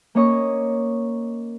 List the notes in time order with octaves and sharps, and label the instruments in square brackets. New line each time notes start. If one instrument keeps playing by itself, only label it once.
[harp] A#3 C#4 C#5 D#5 C#6